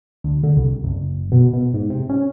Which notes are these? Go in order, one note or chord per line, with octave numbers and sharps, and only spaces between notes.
D2
D3
C2
F#1
B2
B2
G#2
C3
C#4